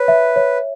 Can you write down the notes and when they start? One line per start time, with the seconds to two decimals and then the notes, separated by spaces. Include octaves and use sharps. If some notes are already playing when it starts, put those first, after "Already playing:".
Already playing: B4 C#5
0.08 E5
0.36 C#5